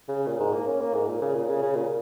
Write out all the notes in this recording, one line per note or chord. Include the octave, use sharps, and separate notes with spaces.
C#3
A#2
G#2
A#3
C#4
A#3
G#2
A#2
C#3
A#2
C#3
C#3
A#2